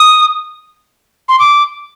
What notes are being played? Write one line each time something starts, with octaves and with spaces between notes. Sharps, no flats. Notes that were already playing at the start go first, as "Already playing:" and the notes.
Already playing: D#6
C6
D6